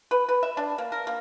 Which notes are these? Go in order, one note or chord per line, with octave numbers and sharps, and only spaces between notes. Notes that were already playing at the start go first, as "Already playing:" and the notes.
B4
B4
E5
D4
A#3
A#4
A#3